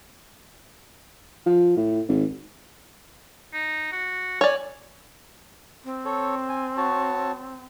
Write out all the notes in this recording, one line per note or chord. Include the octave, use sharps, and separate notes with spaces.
F3
A2
G#1
D#4
F#4
C#5 D5 G#5
C4
A4 C#5
G#5
F#4 C#5 A5